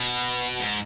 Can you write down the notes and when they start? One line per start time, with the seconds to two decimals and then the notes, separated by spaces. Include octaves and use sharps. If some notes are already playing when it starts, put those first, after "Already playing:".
Already playing: B2
0.60 G#2